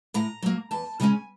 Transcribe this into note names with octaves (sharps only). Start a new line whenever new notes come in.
A2 A#5
F#3 A#3
E2 A5
C#3 F3 G#3 C#4 G#5